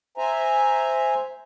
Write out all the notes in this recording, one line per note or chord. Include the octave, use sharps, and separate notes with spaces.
C5 E5 G#5 A#5